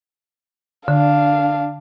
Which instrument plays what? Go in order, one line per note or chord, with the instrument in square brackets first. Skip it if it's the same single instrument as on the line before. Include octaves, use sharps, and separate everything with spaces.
[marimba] D3 [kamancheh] D4 F5